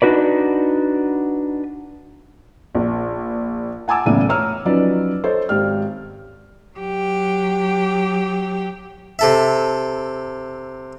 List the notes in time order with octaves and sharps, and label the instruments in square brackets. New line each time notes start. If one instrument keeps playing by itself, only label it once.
[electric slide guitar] D4 D#4 F#4 B4 D5
[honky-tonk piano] A#1
[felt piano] F#5 G#5 A5 D6 E6
B1 A2 C#3 E3 D5 D#7
C#5 A#5 E6 F6
F3 F#3 C#4 D#4 B4 D5
A4 C5 C#5 D#5
G#1 G4 D5 F6
[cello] F#3 G4
[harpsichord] C3 A4 E5